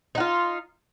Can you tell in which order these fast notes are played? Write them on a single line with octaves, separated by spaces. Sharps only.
D#4 F#4 F4